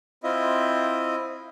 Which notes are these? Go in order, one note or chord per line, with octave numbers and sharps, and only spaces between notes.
C4 E4 F4 D#5 E5